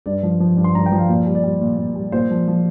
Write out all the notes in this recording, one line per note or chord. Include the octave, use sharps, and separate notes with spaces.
G2 D5
F3
F3
G2
C6
G2 A#5
G5
F3
F5
A#2 D5
G3
D5
G3
A#2
A#2
G3
A#2 C5
F3
F3